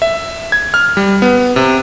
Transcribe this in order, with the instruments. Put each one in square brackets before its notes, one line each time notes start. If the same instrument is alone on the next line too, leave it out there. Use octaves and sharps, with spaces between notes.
[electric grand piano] E5
G#6
F6
G3
B3
C3